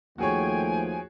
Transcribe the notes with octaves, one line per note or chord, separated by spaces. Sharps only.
D#2 F3 A3 F#4 G#4 C#5 G5 G#5